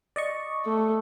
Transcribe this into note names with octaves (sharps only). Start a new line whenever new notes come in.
D5 D#5 C#6
A3